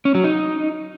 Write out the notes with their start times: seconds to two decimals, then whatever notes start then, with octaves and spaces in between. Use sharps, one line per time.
0.05 C#4
0.15 F#3
0.24 D#4